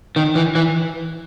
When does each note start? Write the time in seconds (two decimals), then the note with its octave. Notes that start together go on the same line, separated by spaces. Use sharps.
0.16 D#3
0.35 E3
0.55 E3